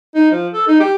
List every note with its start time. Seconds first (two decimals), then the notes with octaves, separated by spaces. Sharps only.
0.15 D#4
0.31 F3
0.53 A4
0.68 D#4
0.80 G4